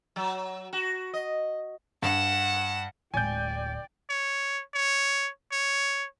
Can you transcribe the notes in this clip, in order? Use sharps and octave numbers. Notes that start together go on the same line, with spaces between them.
F#3
F#4
D#5
G2 F#5 E7
D1 G#3 D5 G5 G#5 G6
C#5
C#5
C#5